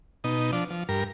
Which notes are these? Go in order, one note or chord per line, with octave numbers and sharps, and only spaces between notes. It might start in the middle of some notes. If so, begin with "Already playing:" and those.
B2 D#4
F3 D4
F3
G2 A#4